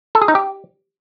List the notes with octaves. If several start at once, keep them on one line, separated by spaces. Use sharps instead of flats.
A4
G#4
D#4
G4